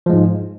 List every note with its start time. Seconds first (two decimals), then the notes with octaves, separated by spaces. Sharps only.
0.06 F3
0.10 G#3
0.13 G#2